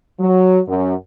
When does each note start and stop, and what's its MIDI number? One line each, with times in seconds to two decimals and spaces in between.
0.20 0.60 54
0.68 0.94 42